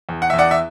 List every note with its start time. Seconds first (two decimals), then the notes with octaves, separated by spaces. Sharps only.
0.09 E2
0.22 F#5
0.30 E2 E5
0.38 D5 F#5
0.51 E5